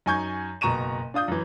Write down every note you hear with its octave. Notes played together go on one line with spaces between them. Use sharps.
F#2 D#4 G#5 C#6 G6 G#6
F#1 B2 A#5 C#6 D#7 E7
D4 F4 D#6 G6
F#2 E3